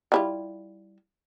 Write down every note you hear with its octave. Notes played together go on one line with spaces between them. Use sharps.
G3 E4 F4